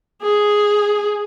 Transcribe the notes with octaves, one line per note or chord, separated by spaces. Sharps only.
G#4